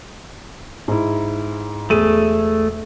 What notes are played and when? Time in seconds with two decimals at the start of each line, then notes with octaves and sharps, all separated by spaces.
0.88 G#2 E4
1.90 E1 A3 G#4 D#7